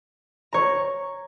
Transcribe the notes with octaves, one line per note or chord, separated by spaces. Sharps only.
C#5 A#5